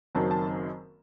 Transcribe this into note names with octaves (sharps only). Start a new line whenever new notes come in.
F#1 F#2 D#3 F#3 C4 A5
A5